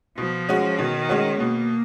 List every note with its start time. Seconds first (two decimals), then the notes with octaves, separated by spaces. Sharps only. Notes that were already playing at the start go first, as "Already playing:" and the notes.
0.18 B2 F3
0.49 G#3 C#4 F#4
0.79 B2 D#3
1.09 G#3 C#4 F#4
1.40 B2 A#3